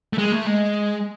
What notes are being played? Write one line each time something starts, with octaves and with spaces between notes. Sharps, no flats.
A3
G#3
A3
G#3